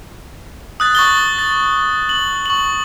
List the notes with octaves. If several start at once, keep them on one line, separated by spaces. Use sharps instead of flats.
D#6 F#6 A6
C#6 A6 G7
A6
F#7
C#6 F#7